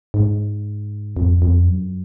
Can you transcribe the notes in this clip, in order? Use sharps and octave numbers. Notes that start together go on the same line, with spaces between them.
G#2
F2
F2
F#2